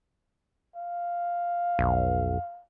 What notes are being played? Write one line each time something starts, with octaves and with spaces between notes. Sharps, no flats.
F5
B1 F2